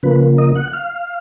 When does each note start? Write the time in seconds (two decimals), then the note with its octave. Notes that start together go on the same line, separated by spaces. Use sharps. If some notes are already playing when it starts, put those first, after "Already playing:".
0.03 C#3 F3 A#3 B4
0.38 D#5
0.56 F#5
0.73 F5